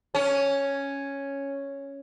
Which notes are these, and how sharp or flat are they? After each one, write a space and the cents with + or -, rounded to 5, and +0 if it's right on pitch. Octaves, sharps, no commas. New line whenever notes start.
C#4 +0